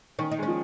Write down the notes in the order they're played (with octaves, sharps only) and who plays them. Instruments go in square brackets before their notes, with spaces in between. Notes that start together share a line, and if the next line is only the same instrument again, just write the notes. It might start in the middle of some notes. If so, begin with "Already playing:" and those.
[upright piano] D#3 [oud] C#4
[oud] D#4
[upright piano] G#3
[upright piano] F3 [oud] C#4